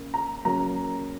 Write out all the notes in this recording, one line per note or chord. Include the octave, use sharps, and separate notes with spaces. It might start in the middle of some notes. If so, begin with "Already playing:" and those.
Already playing: C#3 A#3
A#5
C#3 F#3 A#3 A#5